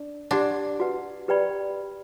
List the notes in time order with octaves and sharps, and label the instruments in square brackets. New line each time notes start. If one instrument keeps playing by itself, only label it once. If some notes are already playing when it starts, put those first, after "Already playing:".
Already playing: [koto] D4
[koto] D4 [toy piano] G4 D5 F#5 C6
[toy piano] F#4 B4 F#5
G4 B4 D5 G5 B5